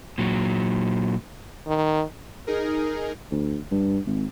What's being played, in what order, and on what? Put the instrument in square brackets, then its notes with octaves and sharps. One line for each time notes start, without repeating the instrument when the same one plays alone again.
[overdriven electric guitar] A#2 F#3
[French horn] D#3
[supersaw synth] D#4 G#4 A#4
[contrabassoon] D2
G2
G#1